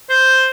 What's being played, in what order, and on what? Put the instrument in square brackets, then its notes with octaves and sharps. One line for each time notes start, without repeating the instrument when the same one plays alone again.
[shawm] C5